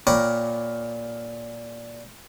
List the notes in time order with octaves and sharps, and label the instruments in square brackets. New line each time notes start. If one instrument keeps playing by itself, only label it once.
[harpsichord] A#2 A#4 C#5 G5 B5 D6